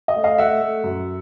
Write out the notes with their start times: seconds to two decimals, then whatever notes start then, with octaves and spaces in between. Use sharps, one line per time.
0.08 D#5
0.16 A3
0.24 D#5 F5
0.38 A3 E5 F#5
0.61 A3
0.83 F#2